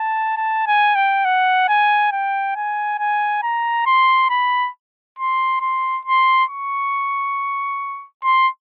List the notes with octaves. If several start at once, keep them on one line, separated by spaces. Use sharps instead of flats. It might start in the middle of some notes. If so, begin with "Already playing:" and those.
Already playing: A5
A5
G#5
G5
F#5
G#5
G5
G#5
G#5
A#5
C6
B5
C6
C6
C6
C#6
C6